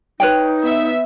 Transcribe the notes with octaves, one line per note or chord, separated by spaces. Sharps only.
D#4 B4 C#5 G5
B3 E5